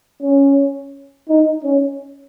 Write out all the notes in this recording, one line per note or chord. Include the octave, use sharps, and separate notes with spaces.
C#4
D#4
C#4